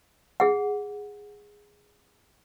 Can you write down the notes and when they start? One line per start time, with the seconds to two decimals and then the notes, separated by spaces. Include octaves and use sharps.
0.40 G#4 F#5